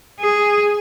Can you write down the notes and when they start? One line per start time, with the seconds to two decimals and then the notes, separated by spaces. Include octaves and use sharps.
0.20 G#4